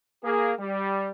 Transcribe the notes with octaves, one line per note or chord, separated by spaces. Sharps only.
A#3 G#4
G3